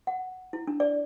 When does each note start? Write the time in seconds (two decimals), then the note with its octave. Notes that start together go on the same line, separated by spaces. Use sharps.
0.07 F#5
0.53 E4
0.67 D4
0.80 D5